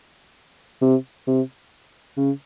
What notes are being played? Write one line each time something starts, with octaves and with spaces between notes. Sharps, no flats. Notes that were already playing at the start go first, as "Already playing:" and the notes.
C3
C3
C#3